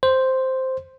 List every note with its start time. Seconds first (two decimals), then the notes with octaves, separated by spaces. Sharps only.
0.03 C5